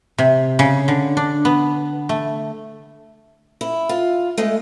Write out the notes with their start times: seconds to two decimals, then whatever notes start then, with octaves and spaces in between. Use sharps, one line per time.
0.18 C3
0.59 C#3
0.88 D3
1.17 D4
1.45 B3
2.09 A3
3.61 E4
3.89 F4
4.38 G#3 A3